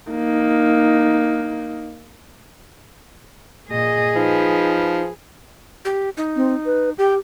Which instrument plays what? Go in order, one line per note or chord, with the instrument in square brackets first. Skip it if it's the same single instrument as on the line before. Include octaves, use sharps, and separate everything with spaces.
[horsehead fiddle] A#3 D#4
[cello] A#2 D#5 [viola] G#4
[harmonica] F3 [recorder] D#4 [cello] B4
[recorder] G4
D#4
[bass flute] C4
B4
[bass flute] G4 [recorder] G5